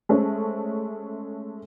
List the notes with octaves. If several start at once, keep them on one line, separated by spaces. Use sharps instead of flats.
G#3 A3 C#4 C5